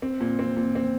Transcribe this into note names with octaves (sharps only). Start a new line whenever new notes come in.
C4
A#2
C4
A#2
C4